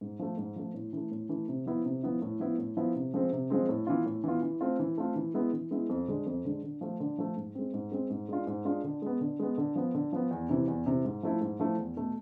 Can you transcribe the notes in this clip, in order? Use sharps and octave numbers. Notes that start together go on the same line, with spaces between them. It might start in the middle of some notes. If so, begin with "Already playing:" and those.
G#2
F3 A3
G#2
F3 A3
A2
E3 A3
A2
E3 A3
C3
F3 B3 E4
C3
F3 B3 E4
A2
F3 B3 E4
A2
F3 B3 E4
C3
F3 G#3 C4
C3
F3 G#3 C4
A2
E3 B3 F4
A2
E3 B3 F4
E3
A3 C4 F4
E3
A3 C4 F4
E3
G#3 B3 E4
E3
G#3 B3 E4
F2
D3 G#3
F2
D3 G#3
D3
F3 A3
D3
F3 A3
G#2
G#3 C4
G#2
G#3 C4
G#2
G#3 D4 F4
G#2
G#3 D4 F4
D3
G#3 B3
D3
G#3 B3
D3
F3 B3
D3
F3 B3
E2
C3 E3
E2
C3 E3
G#2
F3 A3 E4
G#2
F3 A3 E4
E2
B2 A3